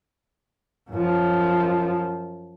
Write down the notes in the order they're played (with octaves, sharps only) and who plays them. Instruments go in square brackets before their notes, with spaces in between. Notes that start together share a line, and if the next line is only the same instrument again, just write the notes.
[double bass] F#2 F3